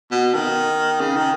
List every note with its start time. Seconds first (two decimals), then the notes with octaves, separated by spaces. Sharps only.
0.11 B2
0.34 D#3
1.01 C#3
1.16 D#3